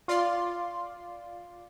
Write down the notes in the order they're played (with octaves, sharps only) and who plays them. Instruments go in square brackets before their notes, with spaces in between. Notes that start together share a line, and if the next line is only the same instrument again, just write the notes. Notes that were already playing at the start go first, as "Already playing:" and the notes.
[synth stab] F4 D5 C6